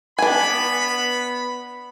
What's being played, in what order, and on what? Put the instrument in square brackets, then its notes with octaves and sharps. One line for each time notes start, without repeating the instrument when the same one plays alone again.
[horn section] B3 B5 [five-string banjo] D4 G#5